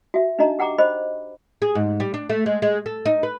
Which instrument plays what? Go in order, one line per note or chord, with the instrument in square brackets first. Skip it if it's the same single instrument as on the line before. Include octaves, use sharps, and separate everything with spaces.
[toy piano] F#4 E5
D4 D#4 F#4 D#5 A#5
G4 F#5 G5 A#5 D6
C5 D#5 B5
[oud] G#4
G#2
G3
D4
A3
G#3
G#3
A4
D#4
B4